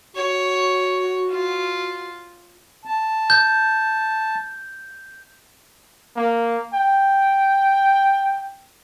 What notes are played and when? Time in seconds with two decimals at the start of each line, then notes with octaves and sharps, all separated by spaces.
0.16 F#4 C#5
1.30 F4
2.85 A5
3.30 G6
6.16 A#3
6.74 G5